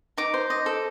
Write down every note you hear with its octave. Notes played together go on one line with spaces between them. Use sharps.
D#4 D6
C5
D#5
A4